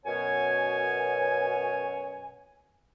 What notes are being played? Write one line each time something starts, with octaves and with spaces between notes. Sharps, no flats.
F#2 B2 C#5 G#5